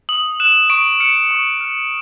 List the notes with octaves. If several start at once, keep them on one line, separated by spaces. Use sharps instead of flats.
D#6 F#7
F#6 E7
C#6 D7
F6 C#7
C#6
F6